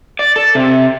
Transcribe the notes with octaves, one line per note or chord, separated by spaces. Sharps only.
D5
A4
C3